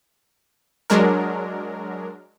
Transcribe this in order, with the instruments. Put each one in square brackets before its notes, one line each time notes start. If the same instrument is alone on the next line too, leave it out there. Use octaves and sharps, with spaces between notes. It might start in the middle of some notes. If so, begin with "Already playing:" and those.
[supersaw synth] F#3 G#3 D4 A#4